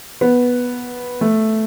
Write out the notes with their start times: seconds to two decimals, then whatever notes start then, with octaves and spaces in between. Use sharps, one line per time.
0.21 B3
1.21 A3